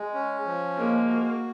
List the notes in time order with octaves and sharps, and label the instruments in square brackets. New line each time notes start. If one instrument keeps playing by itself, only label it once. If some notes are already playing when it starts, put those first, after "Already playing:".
Already playing: [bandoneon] G#3
C#4
F3
[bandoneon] G#3 [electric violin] A#3
[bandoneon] F#4